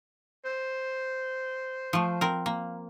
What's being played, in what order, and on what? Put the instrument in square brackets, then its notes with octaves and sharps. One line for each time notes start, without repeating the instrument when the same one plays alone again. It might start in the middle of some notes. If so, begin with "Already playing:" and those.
[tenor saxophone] C5
[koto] F3 A3
C4 A#4
A#3